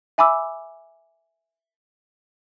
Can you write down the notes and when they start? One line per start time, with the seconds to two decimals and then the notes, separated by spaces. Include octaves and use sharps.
0.18 E5 G#5 B5 D6 E6